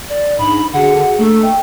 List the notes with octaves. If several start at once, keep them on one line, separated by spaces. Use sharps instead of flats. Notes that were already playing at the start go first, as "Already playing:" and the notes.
D5
G#2 D4 D#4 B5
D3 F#4 G#4 F#5
A3 A#3 D4 A4 C#6
D#5 G5